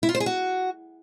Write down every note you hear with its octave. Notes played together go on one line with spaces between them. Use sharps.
E4
F4
C5
G#4
F#4